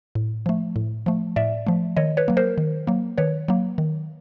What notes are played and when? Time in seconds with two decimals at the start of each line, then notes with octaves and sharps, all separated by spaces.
0.15 A2
0.46 F3 A3
0.76 A2
1.06 F3 A3
1.36 A2 D5 E5
1.67 F3 A3
1.97 D#3 C#5 D#5
2.17 B4 C#5
2.28 F#3 A#3
2.37 A#4 C5
2.58 D#3
2.87 F#3 A#3
3.18 D#3 B4 C#5
3.48 F#3 A#3
3.78 D#3